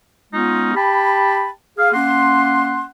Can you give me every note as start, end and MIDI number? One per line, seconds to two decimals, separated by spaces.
0.33 0.72 56
0.33 0.72 59
0.33 0.72 61
0.33 0.72 63
0.33 0.72 65
0.75 1.49 67
0.75 1.49 79
0.75 1.49 81
0.75 1.49 83
1.78 1.93 68
1.78 1.93 77
1.93 2.85 58
1.93 2.85 61
1.93 2.85 78
1.93 2.85 84